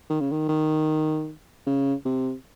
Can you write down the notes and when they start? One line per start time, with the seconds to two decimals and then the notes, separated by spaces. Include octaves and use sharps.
0.10 D#3
0.21 C#3
0.31 D#3
0.49 D#3
1.67 C#3
2.05 C3